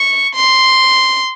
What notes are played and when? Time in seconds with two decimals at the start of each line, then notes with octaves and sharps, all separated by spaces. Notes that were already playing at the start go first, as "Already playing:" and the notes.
Already playing: C#6
0.36 C6